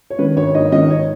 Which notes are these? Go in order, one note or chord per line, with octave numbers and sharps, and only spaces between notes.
C#5
D#3 B4
G#1 C#5
G#2 D#5
D#3 D#5
C#5